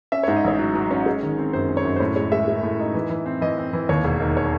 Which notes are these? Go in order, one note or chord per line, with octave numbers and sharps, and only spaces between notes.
C#4 E5
G#2 C#5
D#5
A1 C#5
F#3
F#3
C#4
G#3
D#3
C4
F#2 C5
C4
C#5
F#2
C5
A2 C#5
G#3 C#5
G#3 E5
G#3
A2
D#4
E3
E3
C4
E3 D#5
C4
E3
D#2 C#5
E1
D#3
C#5